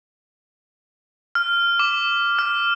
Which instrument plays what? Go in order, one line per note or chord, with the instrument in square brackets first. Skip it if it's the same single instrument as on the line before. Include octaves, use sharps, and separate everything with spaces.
[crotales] F6
D6
F6